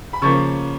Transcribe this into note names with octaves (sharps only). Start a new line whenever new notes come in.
B5
C#3 F3 A#3 C#4 C#6